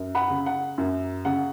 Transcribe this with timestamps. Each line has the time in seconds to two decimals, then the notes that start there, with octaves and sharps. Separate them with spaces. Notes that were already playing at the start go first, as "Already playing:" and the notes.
Already playing: F#2
0.15 F#5 B5
0.30 C#3
0.46 F#5
0.78 F#2
1.25 C#3 F#5